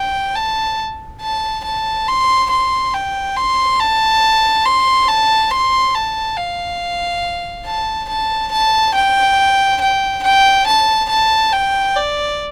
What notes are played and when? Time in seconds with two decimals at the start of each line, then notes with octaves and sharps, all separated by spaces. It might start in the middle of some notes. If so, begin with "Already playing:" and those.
Already playing: G5
0.36 A5
1.21 A5
1.65 A5
2.08 C6
2.51 C6
2.94 G5
3.36 C6
3.80 A5
4.65 C6
5.09 A5
5.52 C6
5.95 A5
6.37 F5
7.66 A5
8.09 A5
8.52 A5
8.95 G5
9.81 G5
10.24 G5
10.67 A5
11.10 A5
11.53 G5
11.96 D5